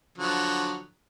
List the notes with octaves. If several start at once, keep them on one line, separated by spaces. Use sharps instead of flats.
D3 F3 F#3